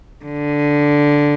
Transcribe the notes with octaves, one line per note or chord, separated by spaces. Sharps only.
D3